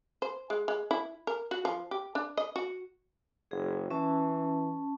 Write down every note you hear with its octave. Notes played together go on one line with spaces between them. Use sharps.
C5
G#3
G#3
E4
A#4
F#4
F3
G4
D4
D#5
F#4
F#1 G#4
E3 C#4 A5